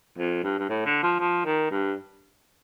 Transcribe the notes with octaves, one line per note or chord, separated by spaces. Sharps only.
F2
G2
G2
A2
D3
F3
F3
D#3
G2